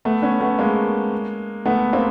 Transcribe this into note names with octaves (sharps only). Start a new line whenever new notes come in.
A3 B3
B3 C#4
A3 B3
G#3 A#3
A3 B3
A#3 C4